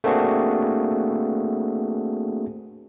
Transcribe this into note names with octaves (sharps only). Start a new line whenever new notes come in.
A3 A#3 C4 D4 F#4 G#4